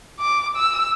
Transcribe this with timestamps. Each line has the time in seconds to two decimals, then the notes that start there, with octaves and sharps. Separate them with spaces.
0.19 D6
0.56 E6